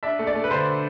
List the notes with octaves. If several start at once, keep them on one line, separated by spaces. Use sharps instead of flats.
D4 E5
A3
D5
A3
B4
D3 C5